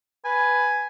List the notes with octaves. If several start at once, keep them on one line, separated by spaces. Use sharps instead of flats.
B4 G#5